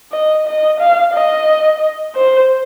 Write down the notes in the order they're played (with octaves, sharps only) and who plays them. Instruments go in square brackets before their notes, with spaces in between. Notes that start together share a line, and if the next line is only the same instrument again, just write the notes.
[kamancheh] D#5
D#5
F5
D#5
C5